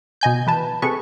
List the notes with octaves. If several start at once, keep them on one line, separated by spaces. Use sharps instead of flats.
B2 D#5 G#5 G6
E3 B4 A5
C3 G#4 A4 B4 C#6